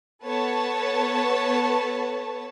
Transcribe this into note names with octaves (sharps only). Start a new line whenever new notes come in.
B3 A4 B4 C#5 A5